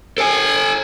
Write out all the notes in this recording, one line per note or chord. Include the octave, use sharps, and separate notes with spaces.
A4 G#5